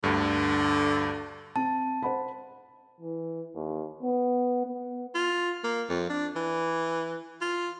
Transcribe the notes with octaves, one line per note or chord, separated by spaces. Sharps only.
D2 G2 D3
C4 A5
C5 F#5 B5
E3
D#2
B3
B3
F4
A#3
F2
D4
E3
F4